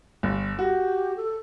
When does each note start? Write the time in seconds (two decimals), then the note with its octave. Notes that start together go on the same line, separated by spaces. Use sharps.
0.23 G1
0.59 F#4 G4
1.17 A4